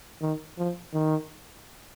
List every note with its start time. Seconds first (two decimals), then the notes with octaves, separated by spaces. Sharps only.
0.22 D#3
0.58 F3
0.94 D#3